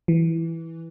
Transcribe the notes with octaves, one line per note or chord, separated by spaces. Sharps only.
E3